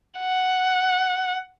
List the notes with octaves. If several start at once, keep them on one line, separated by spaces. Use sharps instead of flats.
F#5